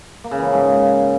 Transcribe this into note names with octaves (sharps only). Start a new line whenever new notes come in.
A#3
C#3
E3
F3
G#2